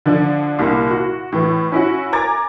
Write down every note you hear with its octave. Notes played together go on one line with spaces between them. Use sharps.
D3 F3 D4
C2 A#2
F#4
A2 E3
C#4 E4 F#4
G#5 A#5 D6 G#6 A6